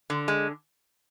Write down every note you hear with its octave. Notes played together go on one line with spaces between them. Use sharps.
D3
G#3